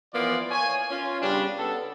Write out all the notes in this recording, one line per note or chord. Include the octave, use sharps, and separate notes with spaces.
E3 F3 A#3 B3 F4 D5
C#5 G#5
C#4 F4
C#3 G3 B3 C#4 D4
B3 A4